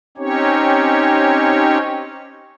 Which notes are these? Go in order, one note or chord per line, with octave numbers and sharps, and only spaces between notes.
C4 C#4 D#4 G4 C#5